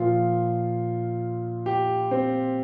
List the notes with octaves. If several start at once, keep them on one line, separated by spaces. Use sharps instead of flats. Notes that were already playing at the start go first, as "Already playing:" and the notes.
Already playing: A#2 F3 F4
G4
C4